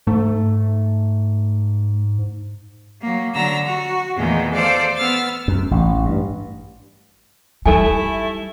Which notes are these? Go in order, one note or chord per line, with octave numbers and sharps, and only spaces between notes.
G#2 A3
F#3 A#3
D3 F#3 A#5 E6
F#4
E2 A#2 D#3 G#3 A3
A4 C5 D5 F5
B3 E6 F6 A6
F#2
A1
G2
G3 A3 D#4 E4 A4 G#5